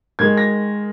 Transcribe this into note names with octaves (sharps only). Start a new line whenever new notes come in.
D#3 G#3 G#6
A#6